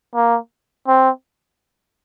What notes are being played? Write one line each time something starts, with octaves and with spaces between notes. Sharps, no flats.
A#3
C4